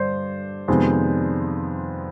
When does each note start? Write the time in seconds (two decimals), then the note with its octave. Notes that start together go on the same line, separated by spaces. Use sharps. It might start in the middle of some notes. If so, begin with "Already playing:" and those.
Already playing: G2 D3 G3 C5 D5
0.68 F2 C3 D#3 G#3 B3